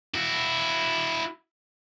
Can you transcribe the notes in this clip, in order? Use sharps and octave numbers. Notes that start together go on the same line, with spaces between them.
E4 F#4